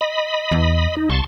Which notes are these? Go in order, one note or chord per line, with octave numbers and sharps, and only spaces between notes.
D#5 B5
E2
D#4
C2 A5 C6 C#6